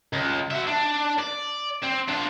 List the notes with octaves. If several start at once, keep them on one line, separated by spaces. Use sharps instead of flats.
C#2
F#4 E5
D4
D5
C4
D4 F4